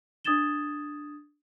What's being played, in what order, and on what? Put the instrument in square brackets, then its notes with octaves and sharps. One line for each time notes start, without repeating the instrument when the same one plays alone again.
[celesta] D4 D#6 G#6 A6 E7 G7